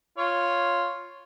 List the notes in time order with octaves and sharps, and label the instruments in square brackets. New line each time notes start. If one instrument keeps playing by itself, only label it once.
[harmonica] F4 C#5